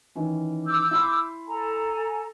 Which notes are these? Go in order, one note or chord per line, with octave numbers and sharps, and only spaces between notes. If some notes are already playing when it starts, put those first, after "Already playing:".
D#3 E3 C#4
D6 E6 G6
E4 B5 C6
A4 G#5 A#5